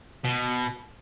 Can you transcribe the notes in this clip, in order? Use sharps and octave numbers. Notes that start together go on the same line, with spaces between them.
B2